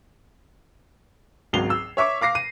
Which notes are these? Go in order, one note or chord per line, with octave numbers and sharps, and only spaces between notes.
G#1 C#2 F#3 C7 F7 G7
E6
C#5 E5 C#6 D6
F5 D6 A#6 C7
D#7